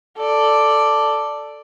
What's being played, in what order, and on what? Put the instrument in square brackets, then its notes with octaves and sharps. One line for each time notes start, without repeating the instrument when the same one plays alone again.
[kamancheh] A4 D5